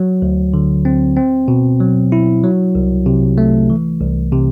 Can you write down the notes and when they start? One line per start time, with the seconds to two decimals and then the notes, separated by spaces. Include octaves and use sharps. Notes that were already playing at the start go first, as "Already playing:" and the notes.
Already playing: F#3
0.22 D2
0.54 D3
0.85 C4
1.17 C4
1.48 B2
1.81 F#3
2.12 E4
2.44 F#3
2.75 C2
3.06 C3
3.38 A3
3.70 E3
4.00 C2
4.32 C3